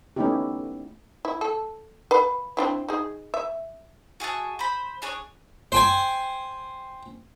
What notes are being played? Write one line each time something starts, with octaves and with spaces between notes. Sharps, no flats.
A3 B3 C#4 D#4 E4 G4
E4
A4
B4 F5 B5
C4 D4 E4
D#4 G#4
E5
F#4 G#4 E5 A5
C5 B5
D4 G#4 C#5
C5 G5 G#5